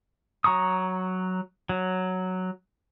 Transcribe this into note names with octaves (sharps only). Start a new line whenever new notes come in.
F#3 A#5 C#6 D#6
F#3